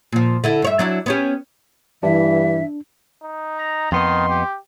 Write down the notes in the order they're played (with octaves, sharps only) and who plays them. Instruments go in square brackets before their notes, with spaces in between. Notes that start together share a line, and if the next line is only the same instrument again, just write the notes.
[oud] A#2 F3
D3 E4 A4
G2 C#5 E5
F#3 D4 E4
B3 C#4 G4
[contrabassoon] G2 [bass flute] E3 [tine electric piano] D4 [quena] E5
[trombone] D#4
[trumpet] A#5
[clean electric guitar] F2 B3 D#5 [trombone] D#3 [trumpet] C6
[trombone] G4